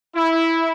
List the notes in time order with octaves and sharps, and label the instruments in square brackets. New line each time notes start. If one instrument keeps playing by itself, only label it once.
[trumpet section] E4